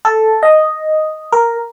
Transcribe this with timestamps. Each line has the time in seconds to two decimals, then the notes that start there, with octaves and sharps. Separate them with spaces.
0.05 A4
0.43 D#5
1.32 A#4